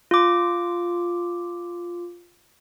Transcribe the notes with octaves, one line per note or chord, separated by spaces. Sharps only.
F4 D6